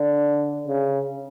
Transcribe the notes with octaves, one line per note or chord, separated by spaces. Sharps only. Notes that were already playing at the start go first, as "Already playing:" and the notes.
Already playing: D3
C#3